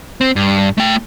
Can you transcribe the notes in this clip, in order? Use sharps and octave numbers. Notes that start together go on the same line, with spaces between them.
C4
G2
A3 G5